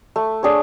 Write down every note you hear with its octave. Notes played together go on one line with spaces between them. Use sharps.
A3
D4 G#4 C#5